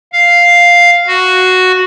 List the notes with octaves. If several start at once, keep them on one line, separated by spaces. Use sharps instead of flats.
F5
F#4